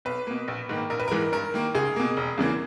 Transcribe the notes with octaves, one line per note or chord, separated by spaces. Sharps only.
B1 B4
B2 A#3
A#1
G#2 D#3 A#3
A#1 A#4
B4
G#2 E3 G#3 A#4
G2 A#4
D#3 A#3
C#2 G#4
B2 A#3
E1
E2 C#3 E3 A#3